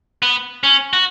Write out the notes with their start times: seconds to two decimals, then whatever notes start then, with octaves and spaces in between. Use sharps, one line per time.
0.22 B3
0.64 C#4
0.93 F#4